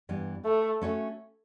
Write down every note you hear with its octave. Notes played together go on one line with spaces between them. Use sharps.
G2 E3 G3 B3
A3
A3 C#4 F#4 A4 C#5